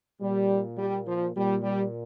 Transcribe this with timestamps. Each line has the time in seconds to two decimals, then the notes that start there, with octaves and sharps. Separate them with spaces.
0.21 A#2 G3
0.78 G3
1.07 F3
1.35 A#2 G3
1.63 G3